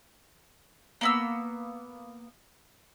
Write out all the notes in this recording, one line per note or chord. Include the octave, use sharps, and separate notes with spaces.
A#3 B3 E6